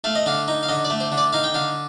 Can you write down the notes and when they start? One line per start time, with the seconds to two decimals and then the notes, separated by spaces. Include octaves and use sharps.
0.04 A3 F5
0.16 D#5
0.26 D3 F5
0.48 D#4
0.63 F5
0.69 D3 D#5
0.85 D5
0.90 A3
1.00 C5
1.12 D3
1.18 D5
1.33 D#4 F5
1.44 G5
1.54 D3 F5